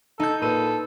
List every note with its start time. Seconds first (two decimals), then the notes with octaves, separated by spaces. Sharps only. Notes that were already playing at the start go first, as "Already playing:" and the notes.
0.20 D#4 A4 G6
0.42 A#2 A4 B4 D#7